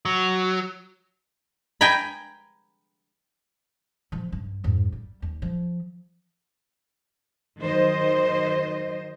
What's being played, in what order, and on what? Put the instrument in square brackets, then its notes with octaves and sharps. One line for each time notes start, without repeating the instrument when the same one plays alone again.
[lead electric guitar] F#3
[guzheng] G5 G#5 A#5 B5
[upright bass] C3 F3
G2
F2 G#2
G3
D#2
F3
[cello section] D#3 F#3 C5 D#5